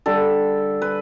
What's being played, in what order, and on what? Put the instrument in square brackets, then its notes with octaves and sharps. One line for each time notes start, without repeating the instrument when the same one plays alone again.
[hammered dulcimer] D3 G3 A4
B4